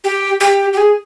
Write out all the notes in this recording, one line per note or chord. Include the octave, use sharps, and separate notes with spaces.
G4
G4
G4
G#4